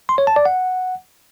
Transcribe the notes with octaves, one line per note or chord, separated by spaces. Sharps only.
C6
C#5
A5
D5
F#5